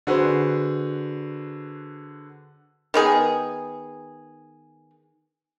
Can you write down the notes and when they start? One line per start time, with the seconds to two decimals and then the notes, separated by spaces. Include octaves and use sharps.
0.07 D3 F#4 G#4 B4 C5
2.94 D#3 B3 G#4